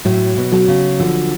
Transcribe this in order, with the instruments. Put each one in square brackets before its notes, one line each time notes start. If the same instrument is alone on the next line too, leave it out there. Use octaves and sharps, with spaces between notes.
[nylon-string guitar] A2 [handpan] F#3
[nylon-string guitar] B2
[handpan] F#3
[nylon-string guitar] C#3
[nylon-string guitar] D3 [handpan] F3